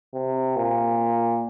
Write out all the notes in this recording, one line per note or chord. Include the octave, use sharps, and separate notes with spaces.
C3
A#2